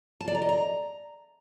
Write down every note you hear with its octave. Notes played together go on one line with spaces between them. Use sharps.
A5
D5
A#5
D#5
A#5